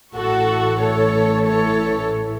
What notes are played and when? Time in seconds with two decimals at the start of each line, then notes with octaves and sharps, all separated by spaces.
0.15 A1 A2 E3 A3 F#4 A4
0.80 A4 C#5
1.46 A4 C#5